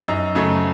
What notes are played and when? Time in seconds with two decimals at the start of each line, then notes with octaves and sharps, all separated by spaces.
0.08 F#2 D#4
0.35 C#3 F#3 A3